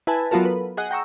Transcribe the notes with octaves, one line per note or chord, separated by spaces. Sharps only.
E4 B4 G#5 A5
F#3 B3 F4 F#4 A4 A#4
B4
G#4 D#5 F#5
G5 A#5 C#6 E6